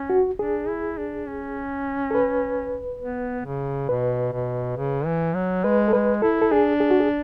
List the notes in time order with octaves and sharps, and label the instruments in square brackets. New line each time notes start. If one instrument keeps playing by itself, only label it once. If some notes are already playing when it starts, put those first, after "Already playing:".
Already playing: [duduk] C#4
[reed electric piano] F#4
[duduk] D4 [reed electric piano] G#4
[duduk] E4
D4
C#4
[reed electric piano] A4
B4
[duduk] B3
C#3
[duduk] B2 [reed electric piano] B4
[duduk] B2
C#3
E3
F#3
[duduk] G#3 [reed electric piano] B4
[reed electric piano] A4
[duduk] G#3 [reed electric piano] B4
[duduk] E4 [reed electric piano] A4
[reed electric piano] A4
[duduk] D4 [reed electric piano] G#4
[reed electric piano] G#4
F#4
G#4